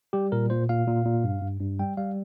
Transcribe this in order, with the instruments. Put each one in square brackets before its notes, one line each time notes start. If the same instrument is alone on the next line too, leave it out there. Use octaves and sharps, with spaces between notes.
[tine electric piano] G3 G4
A#2 A#4
A#2 C5
A#2 F5
A#2
A#2
G2
G2
G2
G3 G5
G3 F5